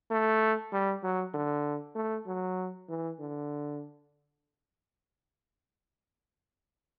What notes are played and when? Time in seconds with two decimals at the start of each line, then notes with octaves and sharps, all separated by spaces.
0.11 A3
0.73 G3
1.03 F#3
1.34 D3
1.96 A3
2.27 F#3
2.89 E3
3.20 D3